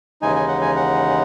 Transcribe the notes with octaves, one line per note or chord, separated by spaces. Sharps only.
D#2 C#3 E3 G#3 D#4 G#5
G#5
F#5
G#5
F#5